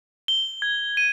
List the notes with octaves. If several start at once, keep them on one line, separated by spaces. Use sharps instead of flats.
G7
G#6
D#7